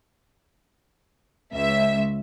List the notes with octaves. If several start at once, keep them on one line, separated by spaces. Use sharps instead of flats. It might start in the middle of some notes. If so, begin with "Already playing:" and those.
C#2 E5